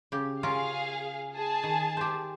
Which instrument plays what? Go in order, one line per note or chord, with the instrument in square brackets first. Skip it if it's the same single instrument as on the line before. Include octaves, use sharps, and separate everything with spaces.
[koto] C#3 G4
[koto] C#4 F4 A#4 [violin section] G#4 F5
[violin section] G#4 A5
[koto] D#3
G4 C5